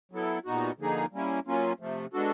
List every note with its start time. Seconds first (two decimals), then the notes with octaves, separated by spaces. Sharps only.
0.12 F#3 B3 E4 A4
0.45 A#2 G3 B3 D#4 F#4
0.78 D3 F3 A#3 D#4 G#4
1.12 G3 A#3 C#4 E4
1.45 F#3 A#3 C#4 F4
1.80 C3 F3 A3
2.13 G#3 B3 D4 F#4 A4